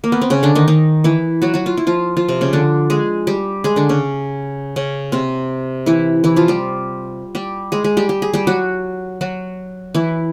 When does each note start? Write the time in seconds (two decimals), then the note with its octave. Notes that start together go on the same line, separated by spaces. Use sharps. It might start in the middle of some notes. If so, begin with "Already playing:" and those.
0.04 A#3
0.12 B3
0.21 C4
0.30 C#3 C#4
0.43 D3 D4
0.55 D#3 D#4
0.68 D#3 D#4
1.04 E3 E4
1.42 F#3 F#4
1.54 F#3 F#4
1.66 F4
1.77 E4
1.87 F3 F4
2.17 F3 F4
2.28 C3 C4
2.41 C#3 C#4
2.53 D3 D4
2.90 G#3 G#4
3.27 G3 G4
3.64 G#3 G#4
3.76 D3 D4
3.89 C#3 C#4
4.76 C#3 C#4
5.12 C3 C4
5.86 E3 E4
6.24 E3 E4
6.36 F3 F4
6.48 G3 G4
7.35 G3 G4
7.72 G#3 G#4
7.84 G#3 G#4
7.97 G3 G4
8.09 G4
8.22 G#4
8.34 G3 G4
8.47 F#3 F#4
9.21 F#3 F#4
9.94 E3 E4